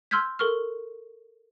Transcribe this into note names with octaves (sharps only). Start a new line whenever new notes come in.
C6 E6 F6 G6 G#6 B6
A4 A#4 C#6 F6